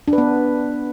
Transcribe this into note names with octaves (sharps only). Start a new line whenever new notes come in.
D4
B4
B3